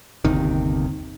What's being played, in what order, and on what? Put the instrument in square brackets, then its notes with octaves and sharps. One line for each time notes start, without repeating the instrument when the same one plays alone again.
[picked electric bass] G1 D#2 C3 D#3